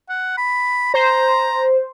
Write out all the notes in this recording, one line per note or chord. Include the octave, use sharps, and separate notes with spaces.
F#5
B5
C5 A#5